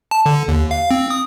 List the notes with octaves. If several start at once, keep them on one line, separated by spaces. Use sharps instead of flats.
A5
D3
D#2
F5
C4
D#6